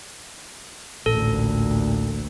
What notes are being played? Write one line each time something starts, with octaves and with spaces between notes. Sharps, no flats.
A1 D2 A#2 A4